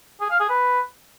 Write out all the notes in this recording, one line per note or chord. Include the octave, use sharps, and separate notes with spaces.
G#4
F5
G#4
B4